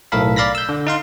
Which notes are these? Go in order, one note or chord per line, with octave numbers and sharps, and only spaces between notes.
B1 A2 A4 A#4 F5 B5
D5 F5 B5 A#6 B6
E6 G6
D3
D#4 F5 C6